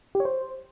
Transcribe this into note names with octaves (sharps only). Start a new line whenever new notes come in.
G4
C#5
C5